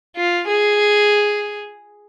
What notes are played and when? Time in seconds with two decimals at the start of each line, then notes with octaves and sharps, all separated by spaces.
0.16 F4
0.48 G#4